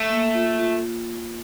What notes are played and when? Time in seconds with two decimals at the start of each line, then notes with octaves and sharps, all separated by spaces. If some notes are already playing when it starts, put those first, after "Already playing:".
Already playing: A3
0.10 A#3
0.34 F4
0.59 F4